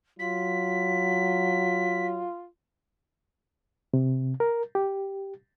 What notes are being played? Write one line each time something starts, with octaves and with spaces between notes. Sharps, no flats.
F#3 F4 B6
C3
A#4
G4